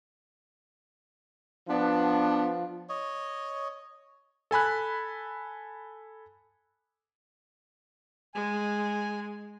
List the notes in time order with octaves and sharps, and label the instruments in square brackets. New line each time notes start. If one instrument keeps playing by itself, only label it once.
[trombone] F3 [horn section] B3 D4
[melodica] C#5 D#5
[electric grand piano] A4 G#5 B5 F#6
[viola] G#3 [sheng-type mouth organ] G#5